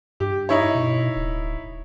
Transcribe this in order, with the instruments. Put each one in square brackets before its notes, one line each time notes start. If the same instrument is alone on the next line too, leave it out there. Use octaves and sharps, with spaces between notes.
[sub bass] G2 [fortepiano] G4
[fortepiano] D#4 E4 C#5
[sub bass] B2
D1